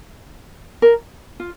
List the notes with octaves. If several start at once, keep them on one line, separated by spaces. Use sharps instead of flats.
A#4
F4